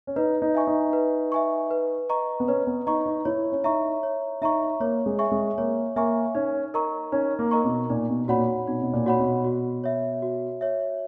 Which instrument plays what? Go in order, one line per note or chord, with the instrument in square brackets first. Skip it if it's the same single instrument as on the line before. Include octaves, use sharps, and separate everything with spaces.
[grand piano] C#4
[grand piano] D#4 [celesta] B4
[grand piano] D#4
[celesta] E5 G#5 C#6
[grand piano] D#4
[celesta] B4
E5 G#5 C#6
B4
D#5 A#5 C#6
[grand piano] B3
[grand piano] C#4 [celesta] B4
[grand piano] B3
[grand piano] D#4 [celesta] D#5 A#5 C#6
[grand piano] D#4
[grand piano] E4 [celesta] C#5
[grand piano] C#4
[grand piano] D#4 [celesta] E5 A#5 C#6
[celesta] C#5
[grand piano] D#4 [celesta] E5 A#5 C#6
[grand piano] A#3 [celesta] C#5
[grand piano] G#3
[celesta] E5 G#5 C#6
[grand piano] G#3
[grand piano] A#3 [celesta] C#5
[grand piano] A#3 [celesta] E5 G#5 C#6
[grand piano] C#4 [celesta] D#4
[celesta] A#4 D#5 A#5 C#6
[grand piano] C#4 [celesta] D#4
[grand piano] A#3
[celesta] A#4 D#5 A#5 C#6
[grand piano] B2
[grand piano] A#2 [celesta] D#4
[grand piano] B2
[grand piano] A#2 [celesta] F#4 C#5 F#5 B5
[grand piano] B2 [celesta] D#4
[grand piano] B2
A#2
[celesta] F#4 C#5 F#5 B5
[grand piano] B2
[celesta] F#4
C#5 E5
F#4
C#5 E5